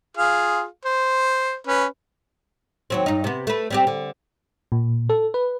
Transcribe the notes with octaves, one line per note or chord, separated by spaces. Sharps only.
F4 G#4 F5
C5
C#4 B4
D#2 F#3 C4
G2 D#4
C3 B3
A3 B4
G3 C4 G4
D3
A#2
A4
B4